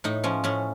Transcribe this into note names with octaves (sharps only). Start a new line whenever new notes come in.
A2 D#4
F3 C#4
A2 C#4